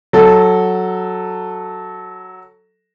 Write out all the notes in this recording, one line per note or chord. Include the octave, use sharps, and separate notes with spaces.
F#3 A4